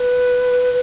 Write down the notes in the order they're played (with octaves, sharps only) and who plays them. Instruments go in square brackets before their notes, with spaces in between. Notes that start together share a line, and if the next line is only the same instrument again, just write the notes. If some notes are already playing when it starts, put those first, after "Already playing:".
Already playing: [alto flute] B4